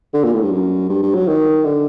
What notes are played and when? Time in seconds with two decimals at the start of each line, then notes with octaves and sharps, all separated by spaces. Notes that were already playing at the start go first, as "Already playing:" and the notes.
0.14 D3
0.24 A#2
0.33 A2
0.43 G2
0.52 F#2
0.89 G2
1.03 G2
1.15 F#3
1.28 D#3
1.65 D3